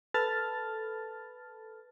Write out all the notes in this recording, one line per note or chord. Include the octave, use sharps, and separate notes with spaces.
A4 B4 A5 B5 F6 A6